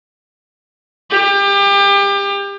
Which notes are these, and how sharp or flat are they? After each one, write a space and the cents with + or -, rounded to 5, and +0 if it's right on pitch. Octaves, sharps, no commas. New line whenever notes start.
G4 +30